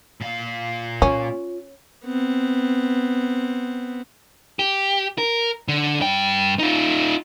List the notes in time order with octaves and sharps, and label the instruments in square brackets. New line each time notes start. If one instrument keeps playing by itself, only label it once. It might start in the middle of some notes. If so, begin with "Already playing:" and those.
[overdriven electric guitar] A#2 F5
[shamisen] C#4 [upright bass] F4
[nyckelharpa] B3 C4
[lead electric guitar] G4
A#4
D3
G2 G5
D#4 F4